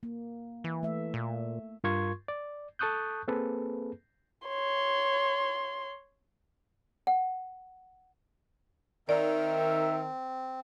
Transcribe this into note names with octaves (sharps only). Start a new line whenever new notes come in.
A#3
E3
A3 E5
A#2
G2 F4 A#4 C6 C#6 G#6
D5
A4 A5 C#6 D#6 F#6 G6
A#3 C4 G#4 A4 B4
C#5 C6
F#5
D#3 C4 A#4 D5 E5